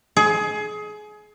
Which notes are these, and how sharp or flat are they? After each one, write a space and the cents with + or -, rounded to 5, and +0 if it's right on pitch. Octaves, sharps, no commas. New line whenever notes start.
G#4 +25